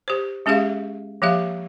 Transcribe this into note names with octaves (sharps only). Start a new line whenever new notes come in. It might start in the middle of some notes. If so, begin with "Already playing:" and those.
G4 C5
G#3 C#4 G4 G#4 E5 F5
F3 A#3 G4 E5 F5